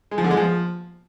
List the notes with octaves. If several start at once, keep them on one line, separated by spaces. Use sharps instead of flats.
G#3
F3
D3
G#3
F3